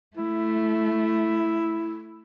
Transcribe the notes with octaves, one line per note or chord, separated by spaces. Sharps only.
A3 E4